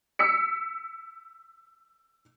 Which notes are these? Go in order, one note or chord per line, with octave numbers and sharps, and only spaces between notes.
E6 B6 C#7